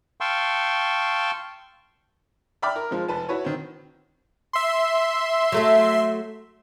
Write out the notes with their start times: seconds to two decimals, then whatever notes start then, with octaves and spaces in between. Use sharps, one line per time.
0.21 F5 G5 A5 C6 C#6 E6
2.62 D5 E5 G5 B5 D6 F6
2.76 A#4
2.91 F3 G#3
3.08 F1 B4 A5
3.29 E4 F#4 B4 C#5
3.44 D#3 C4
4.53 E5 C6
5.52 F#3 A3 A4